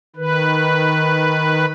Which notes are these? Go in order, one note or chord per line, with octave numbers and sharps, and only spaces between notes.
D#3 B4